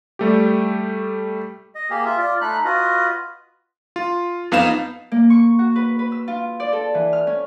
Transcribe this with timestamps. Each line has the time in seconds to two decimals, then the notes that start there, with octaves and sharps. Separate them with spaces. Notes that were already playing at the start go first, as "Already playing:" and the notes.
0.19 G3 A3 G4
1.75 D#5
1.90 A#3 G4 G#4
2.05 F4 E5
2.18 F4 D5
2.41 A3 D#4 B5 F#6
2.65 F4 F#4 B4 D#5
3.96 F4
4.52 F2 B3 D#4 F5 E7
5.12 A#3
5.30 C#6
5.59 F#4
5.76 B4
5.99 B4
6.12 E6
6.28 F4
6.60 D5
6.73 A4
6.94 E3
7.13 F6
7.27 C#4